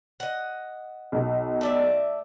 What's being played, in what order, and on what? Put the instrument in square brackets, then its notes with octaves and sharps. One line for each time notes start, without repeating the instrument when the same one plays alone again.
[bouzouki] D#5 F#5
[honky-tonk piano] B1 B2
[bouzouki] A3 D5 E5